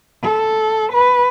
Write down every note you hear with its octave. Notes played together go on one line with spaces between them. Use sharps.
A4
B4